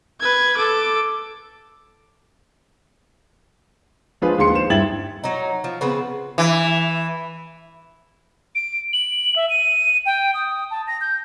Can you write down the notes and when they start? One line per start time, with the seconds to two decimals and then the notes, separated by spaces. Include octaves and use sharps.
0.20 B4 G#6
0.57 A4 D6
4.22 F3 G#3 D4 F4 G#4 B4
4.38 D#2 G#3 C6 C#7
4.54 C5 E7
4.70 G2 E4 G5 G#6 A6 F#7
5.24 F#3 D#4
5.64 F3
5.81 C#3 B3 C4 B4
6.38 E3
8.55 D7
8.93 F#7
9.36 E5
9.49 D#7
10.06 G5
10.34 D#6
10.71 A5
10.87 A#6
11.01 G6